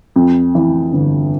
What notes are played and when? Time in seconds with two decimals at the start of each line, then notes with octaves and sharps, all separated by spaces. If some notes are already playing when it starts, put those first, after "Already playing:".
0.16 F2
0.55 E3
0.93 G1